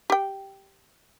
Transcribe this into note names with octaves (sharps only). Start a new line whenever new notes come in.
G4 G5